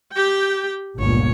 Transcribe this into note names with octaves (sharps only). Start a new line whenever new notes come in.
G4 G5
G1 C#2 A#2 C#5